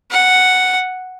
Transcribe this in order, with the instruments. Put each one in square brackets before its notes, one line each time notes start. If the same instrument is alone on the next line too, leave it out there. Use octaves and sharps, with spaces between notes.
[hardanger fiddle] F#5